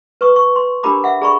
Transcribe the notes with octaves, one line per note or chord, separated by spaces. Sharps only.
B4 C#6 D#6
C#6
C6
D4 G4 A#4 A#5 B5 D6
E5 F#5
G#4 D5 A#5 B5 C#6